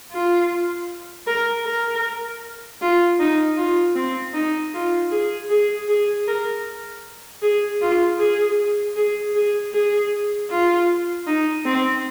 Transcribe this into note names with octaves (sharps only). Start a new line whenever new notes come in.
F4
A#4
A#4
F4
D#4
F4
C4
D#4
F4
G#4
G#4
G#4
A#4
G#4
F4
G#4
G#4
G#4
G#4
F4
D#4
C4